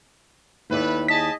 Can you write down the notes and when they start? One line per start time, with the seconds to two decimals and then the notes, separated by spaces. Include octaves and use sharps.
0.70 D#2 A3 E4 B4 D5
1.08 G#4 D#5 A5 B6